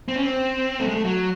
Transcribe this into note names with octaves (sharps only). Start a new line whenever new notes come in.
C4
C#4
C4
A3
G#3
A3
F#3